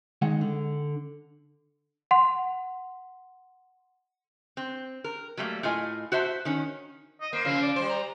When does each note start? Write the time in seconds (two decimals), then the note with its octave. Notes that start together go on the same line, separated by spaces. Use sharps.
0.22 D#3 G#3 F#5
0.41 D3
2.11 F#5 C6
4.57 C4
5.04 A#4
5.37 F#3 G3 A3 A#3
5.63 A2 F4 D#5 G#5
6.12 F#4 C5 E5 A5
6.45 D#3 C#4
7.21 D#5
7.33 A#3 C5
7.45 C#3 F3 F5
7.62 D5
7.76 G3 C5
7.89 A#5